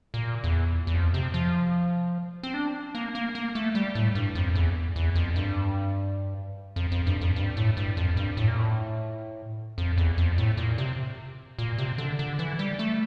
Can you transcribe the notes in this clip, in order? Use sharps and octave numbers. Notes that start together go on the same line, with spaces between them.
A#2
E2
E2
F2
C3
F3
C4
D4
A#3
A#3
A#3
A3
G3
A2
G2
F2
E2
E2
F2
G2
F2
F2
G2
F2
G2
A2
G2
F2
G2
A2
A#2
A2
F2
E2
F2
A2
A#2
C3
A#2
C3
D3
D3
E3
G3
A3